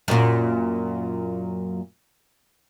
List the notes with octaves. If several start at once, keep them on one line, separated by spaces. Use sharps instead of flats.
F#2 A#2